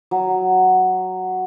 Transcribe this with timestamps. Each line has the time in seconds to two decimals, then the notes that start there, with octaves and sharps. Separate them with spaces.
0.11 F#3